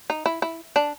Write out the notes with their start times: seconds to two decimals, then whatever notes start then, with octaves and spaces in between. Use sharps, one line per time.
0.10 D#4
0.26 E4
0.42 E4
0.76 D4